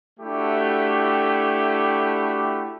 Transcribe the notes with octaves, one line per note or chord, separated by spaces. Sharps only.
A3 D4 E4 F#4 G4